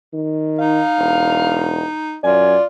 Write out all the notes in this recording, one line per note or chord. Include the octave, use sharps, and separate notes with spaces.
D#3
D#4 F5
E1
F#2 F4 D5 G#5